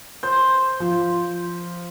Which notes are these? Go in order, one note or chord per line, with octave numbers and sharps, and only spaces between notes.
C5 G6
F3